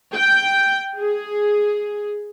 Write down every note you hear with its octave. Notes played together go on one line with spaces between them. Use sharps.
G5
G#4